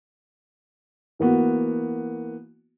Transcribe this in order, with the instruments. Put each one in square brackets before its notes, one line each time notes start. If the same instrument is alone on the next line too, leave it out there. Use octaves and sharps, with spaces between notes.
[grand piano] E3 A#3 B3 F#4